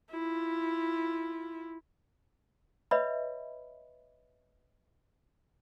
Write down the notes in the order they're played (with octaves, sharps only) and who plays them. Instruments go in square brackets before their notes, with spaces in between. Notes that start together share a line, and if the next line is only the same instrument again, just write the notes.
[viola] E4 F4
[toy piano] B4 C#5 D#5 E5 B5